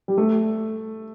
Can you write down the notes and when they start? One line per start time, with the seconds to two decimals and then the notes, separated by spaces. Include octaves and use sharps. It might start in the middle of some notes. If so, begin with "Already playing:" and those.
0.08 G3
0.18 A3